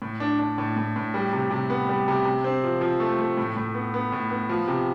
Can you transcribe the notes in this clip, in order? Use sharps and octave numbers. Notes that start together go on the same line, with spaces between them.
A2
D4
D4
A2
A2
A2
G3
C3
C3
B3
G3
C3
C3
C4
F3
F3
A3
A3
A2
A2
B3
B3
A2
B3
F3
C3